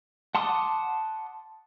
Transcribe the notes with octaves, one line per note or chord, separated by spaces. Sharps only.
F#5 A5 C6 D6 D#6